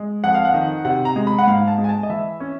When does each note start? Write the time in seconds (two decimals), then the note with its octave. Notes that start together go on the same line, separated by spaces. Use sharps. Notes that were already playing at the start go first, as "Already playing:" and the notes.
Already playing: G#3
0.24 F2 F#5
0.34 F5
0.45 F#5
0.54 D#3
0.85 C3 F#5
1.05 A#5
1.16 G#3
1.27 B5
1.38 F#5
1.47 G#2 F5
1.68 A5
1.78 G#3
1.84 G#5
1.89 A5
2.03 D#5
2.09 E3 E5
2.40 C#4